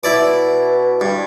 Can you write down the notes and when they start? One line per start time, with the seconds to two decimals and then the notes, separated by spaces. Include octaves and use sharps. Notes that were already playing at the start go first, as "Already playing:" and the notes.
0.04 B2 E4 D5 D6
1.01 G2